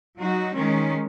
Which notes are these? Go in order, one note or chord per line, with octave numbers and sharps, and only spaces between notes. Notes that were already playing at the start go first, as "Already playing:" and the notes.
F#3 D#4 F#4
D#3 G#3 C#4